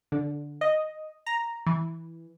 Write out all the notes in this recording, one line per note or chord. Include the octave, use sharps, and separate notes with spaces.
D3
D#5
A#5
E3